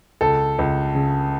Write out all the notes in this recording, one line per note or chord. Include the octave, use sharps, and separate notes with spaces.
C#2 A4
C#2
C#3